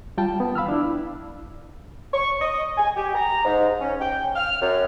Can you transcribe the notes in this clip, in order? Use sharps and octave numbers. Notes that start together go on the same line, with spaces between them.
G3 F4 G5 A5
B3
F5 B5 E6 F6
D4 E4
C#6
D#5
G#5
G4
A#5
G#2
C#4
G5
F6
F#2